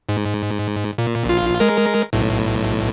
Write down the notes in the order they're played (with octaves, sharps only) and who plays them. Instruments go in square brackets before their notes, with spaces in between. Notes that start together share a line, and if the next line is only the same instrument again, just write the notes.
[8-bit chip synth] G#2
A#2
A#1 F4
G#3 A#4
B1 A2